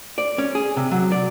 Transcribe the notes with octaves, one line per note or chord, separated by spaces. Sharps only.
D5
C#4
G#4
C3
F#3
D5